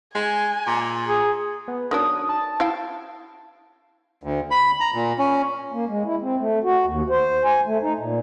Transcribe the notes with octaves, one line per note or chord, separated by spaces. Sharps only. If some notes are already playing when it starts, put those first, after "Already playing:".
G#3 G#5
A#2
G#4
B3
D#3 F#3 D4 D#6
A5
E4 F5 G5
D2
B5
A#5
A#2
C#4
A#3
G#3
E4
C4
A3
F#4
D#2
C5
G#5
A3
D#4
A#2